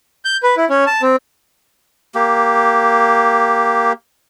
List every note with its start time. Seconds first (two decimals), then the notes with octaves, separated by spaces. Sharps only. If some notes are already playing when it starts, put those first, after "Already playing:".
0.25 G6
0.43 B4
0.57 E4
0.70 C#4
0.87 A5
1.02 C4
2.15 A#3 G4